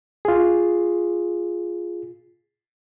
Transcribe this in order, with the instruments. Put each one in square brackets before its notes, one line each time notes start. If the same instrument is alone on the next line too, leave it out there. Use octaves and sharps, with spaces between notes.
[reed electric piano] F4 G#4